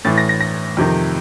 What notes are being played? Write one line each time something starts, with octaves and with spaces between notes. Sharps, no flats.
A2 E3 A6
A#6
A#6
A#6
F2 C3 D#3